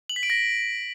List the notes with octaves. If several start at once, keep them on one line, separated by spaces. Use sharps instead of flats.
F#7
B6
D7
A#6